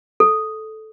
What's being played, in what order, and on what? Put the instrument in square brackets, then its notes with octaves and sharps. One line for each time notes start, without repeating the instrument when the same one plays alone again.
[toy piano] A4